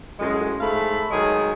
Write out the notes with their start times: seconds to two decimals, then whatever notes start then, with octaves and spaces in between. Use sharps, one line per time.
0.20 F#2 A2 G#3
0.60 G#2 A3 F5 B5
1.11 D#3 F#3 G#3 G#4